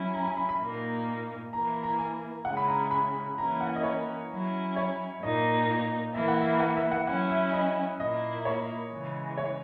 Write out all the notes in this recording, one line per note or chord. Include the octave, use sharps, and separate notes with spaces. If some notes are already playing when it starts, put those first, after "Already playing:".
Already playing: F#3 C#4 E4
A#5
G#5
B5
B5
A#2 A#3 D#4
E3 A#3 E4 A#5
A#5
G#5
C#3 G#3 C#4 E4 F#5
B5
A#5
B5
E3 A#3 C#4 E4 A#5
F#5
D#5
C#5
F#3 C#4 E4
C#5
A#2 A#3 D#4 D#5
E3 A#3 E4 E5
F#5
E5
F#5
E5
F#5
F#3 C#4 E4 F#5
E5
D#5
A#2 A#3 E4 D#5
C#5
C#3 E3 G#3
C#5